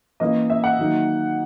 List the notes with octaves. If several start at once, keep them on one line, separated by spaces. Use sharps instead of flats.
E3 A#3 C#4 D#5
E5
F#5
D#3 F#3 A#3 D#4